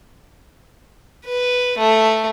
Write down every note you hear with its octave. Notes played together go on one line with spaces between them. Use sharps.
B4
A3